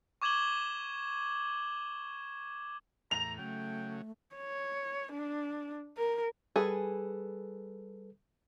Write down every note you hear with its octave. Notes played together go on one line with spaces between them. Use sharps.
C#6 D6 G#6 E7 F#7 G7
E2 A2 A#5 F7
C#3 F#3 A3 G5
C#5
D4
A#4
G3 G#4 A4 B4